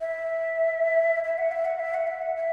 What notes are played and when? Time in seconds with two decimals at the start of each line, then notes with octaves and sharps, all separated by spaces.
0.01 E5
1.24 E5
1.38 F#5
1.52 E5
1.65 F#5
1.80 E5
1.94 F#5
2.07 E5
2.22 F#5
2.36 E5